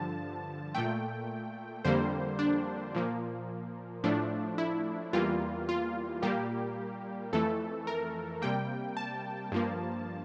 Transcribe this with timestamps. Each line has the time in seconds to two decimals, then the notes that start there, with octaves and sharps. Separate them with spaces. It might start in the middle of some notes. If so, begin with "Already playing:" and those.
Already playing: G2 D3 F3 A5
0.75 A#2 A3 G5
1.85 F2 D3 G3 A#3 C5
2.39 D4
2.95 A#2 F3 A#3
4.04 A2 F3 A3 D4
4.58 E4
5.13 E2 E3 G3 A#3 F4
5.69 F4
6.22 A#2 G3 A#3 G4
7.33 F2 E3 A3 A4
7.87 A#4
8.42 C3 G3 A#3 G5
8.97 A5
9.52 G2 F3 A#3